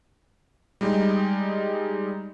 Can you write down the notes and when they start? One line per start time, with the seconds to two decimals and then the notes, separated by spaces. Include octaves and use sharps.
0.81 G3 G#3 D#4